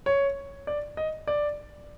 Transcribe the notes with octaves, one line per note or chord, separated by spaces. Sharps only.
C#5
D5
D#5
D5